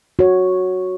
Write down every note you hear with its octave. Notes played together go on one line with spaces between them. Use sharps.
F#4 C#5